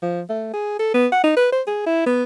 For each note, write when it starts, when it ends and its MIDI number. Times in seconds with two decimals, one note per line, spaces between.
0.02 0.21 53
0.29 0.49 57
0.53 0.79 68
0.79 0.92 69
0.94 1.07 59
1.12 1.20 78
1.24 1.33 63
1.36 1.50 71
1.52 1.62 72
1.67 1.82 68
1.86 2.02 64
2.06 2.24 59